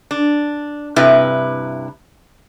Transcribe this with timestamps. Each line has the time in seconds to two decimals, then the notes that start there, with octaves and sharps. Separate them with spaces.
0.11 D4
0.96 G2 C3 E4 B4